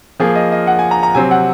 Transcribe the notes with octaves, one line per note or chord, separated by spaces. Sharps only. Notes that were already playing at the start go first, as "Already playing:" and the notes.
F3 A#3 F4 G#4
D#5
D#5
F#5
G#5
A#5
A#5
C3 F#3 C4 G#5
F#5